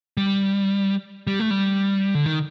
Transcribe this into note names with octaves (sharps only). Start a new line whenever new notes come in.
G3
G3
A3
G3
D3
D#3